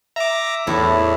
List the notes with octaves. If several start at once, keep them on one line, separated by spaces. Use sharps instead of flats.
E5 A#5 D6
E2 A2 E4